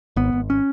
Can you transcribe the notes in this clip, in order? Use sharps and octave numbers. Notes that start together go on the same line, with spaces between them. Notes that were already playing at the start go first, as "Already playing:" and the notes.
G#1 B3
G#1
C#4